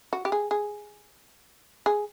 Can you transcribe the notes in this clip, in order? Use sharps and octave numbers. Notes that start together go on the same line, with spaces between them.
F#4
G4
G#4
G#4
G#4